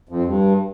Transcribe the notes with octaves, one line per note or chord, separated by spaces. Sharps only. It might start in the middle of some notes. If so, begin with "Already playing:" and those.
F2
G2